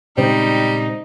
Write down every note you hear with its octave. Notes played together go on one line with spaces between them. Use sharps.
A#2 C#3 G3 G#3 C4 D#4